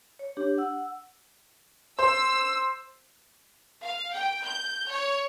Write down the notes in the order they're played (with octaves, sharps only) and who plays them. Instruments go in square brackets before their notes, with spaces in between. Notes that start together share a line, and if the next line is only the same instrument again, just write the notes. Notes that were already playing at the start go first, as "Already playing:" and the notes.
[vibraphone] C#5
D4 G4
F#5 E6
[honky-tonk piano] C5 [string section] E6
[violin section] F5
G5
G6
C#5